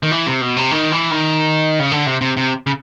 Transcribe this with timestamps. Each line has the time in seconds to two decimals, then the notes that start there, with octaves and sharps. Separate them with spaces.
0.03 D#3
0.11 E3
0.26 C3
0.41 B2
0.56 C3
0.71 D#3
0.92 E3
1.11 D#3
1.79 C#3
1.91 D3
2.06 C3
2.21 C3
2.37 C3
2.67 C#3